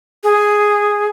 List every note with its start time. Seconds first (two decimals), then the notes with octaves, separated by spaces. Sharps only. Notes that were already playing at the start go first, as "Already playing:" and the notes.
0.24 G#4